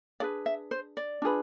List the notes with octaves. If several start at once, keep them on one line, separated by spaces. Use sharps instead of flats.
D4 G#4 B4 D5
E5
C5
D5
D4 F4 G#4 B4